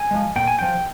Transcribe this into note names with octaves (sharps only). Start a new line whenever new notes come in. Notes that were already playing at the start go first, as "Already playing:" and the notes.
Already playing: G#5
F3 G#3
A#2 G5
G#5
F3 G#3 G5